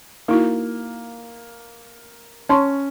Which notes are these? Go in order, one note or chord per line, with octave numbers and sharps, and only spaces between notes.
A#3 D#4 E4 F#4
C#4 A5 C6 C#6